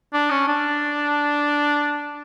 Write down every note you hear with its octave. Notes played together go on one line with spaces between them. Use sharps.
D4
C#4
D4